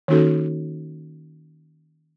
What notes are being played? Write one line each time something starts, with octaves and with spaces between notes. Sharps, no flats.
D#3 A#3 C#4 D#4 F#4 A4